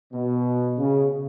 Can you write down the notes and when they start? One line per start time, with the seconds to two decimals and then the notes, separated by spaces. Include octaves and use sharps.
0.13 B2
0.78 C#3